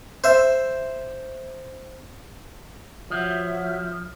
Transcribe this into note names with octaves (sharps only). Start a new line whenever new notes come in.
C5 E5
F3 F#4 C#5 E5